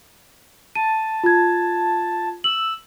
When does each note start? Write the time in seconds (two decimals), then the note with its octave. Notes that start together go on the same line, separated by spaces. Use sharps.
0.75 A5 D#7
1.24 F4 G#6
2.44 E6 F#7